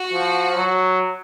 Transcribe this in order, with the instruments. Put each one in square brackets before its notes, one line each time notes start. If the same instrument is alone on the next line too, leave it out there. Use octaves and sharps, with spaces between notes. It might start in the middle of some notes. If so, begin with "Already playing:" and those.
Already playing: [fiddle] F#4
[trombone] F3
F#3